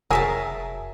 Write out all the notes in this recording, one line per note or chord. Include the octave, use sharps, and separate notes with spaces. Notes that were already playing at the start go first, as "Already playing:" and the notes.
F1 F#3 G#4 A#4 E5 A5